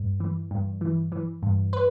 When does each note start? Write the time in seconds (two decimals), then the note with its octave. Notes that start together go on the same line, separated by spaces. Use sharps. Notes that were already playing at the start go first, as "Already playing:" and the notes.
Already playing: G2
0.20 E3
0.51 G2
0.81 E3
1.12 E3
1.43 G2
1.73 B4